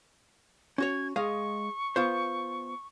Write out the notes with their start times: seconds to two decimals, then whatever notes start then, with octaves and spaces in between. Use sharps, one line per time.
0.78 C#4 F#4 C#5 G#6
1.16 G#3 D#5 F5 C#6
1.96 B3 F4 C5